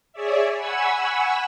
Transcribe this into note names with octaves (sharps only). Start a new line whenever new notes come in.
G#4 C#5 D5 E5
F#5 G#5 B5 C#6 E6